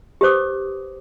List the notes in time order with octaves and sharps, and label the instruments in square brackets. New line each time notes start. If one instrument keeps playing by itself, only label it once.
[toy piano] G4 B4 C5 D6 D#6